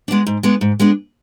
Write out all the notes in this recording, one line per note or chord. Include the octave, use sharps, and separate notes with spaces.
G#3 B3 D4
G#2
G#3 B3 D4
G#2
G#3 B3 D4